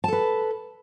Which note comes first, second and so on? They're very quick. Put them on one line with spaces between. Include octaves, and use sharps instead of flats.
A5 A4 B4